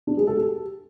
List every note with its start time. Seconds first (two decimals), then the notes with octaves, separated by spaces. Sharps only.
0.07 D4
0.17 G#3
0.27 A4
0.37 G4